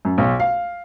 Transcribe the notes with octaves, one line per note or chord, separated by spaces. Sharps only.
F#2
B1
F5